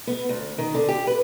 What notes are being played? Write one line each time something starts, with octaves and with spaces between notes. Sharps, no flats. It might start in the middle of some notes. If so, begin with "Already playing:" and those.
B3
D2
D#3
D3
G4
B4